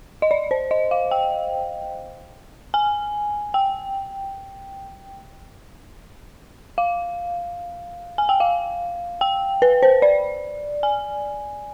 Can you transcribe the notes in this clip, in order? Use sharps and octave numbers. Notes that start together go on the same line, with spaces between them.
D#5
D5
C5
D#5
F5
G5
G#5
G5
F5
G#5
G5
F5
G5
B4
C5
D5
G#5